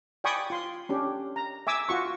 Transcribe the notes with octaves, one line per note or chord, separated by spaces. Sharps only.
D5 G5 G#5 B5 C#6 D#6
F4 C6
C#4 D4 G4
A#5
E5 G#5 D6 E6
F4 F#4 C#6